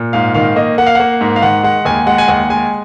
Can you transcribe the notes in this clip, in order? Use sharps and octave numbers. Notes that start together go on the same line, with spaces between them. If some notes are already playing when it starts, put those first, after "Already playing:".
Already playing: A#2
G#2 F5
D#3 F5
A#3 D#5
A#3 F#5
F5
A#3 F#5
G#2
F5
D#3 F#5
G#3 F#5
D#2 G#5
G#3 F#5
G#5
D#2 F#5
G#3 G#5